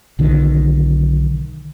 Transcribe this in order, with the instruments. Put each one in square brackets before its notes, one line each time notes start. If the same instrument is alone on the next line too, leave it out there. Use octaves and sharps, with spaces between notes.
[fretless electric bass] B1 D3 D#3